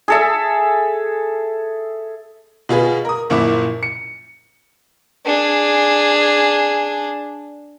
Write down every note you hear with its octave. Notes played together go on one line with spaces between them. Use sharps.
G#4 A4 E5
B2 F4 G#4 B4
A#4 D#6
F#1 A#2 F3 E4 D6
C#7
D4 G#4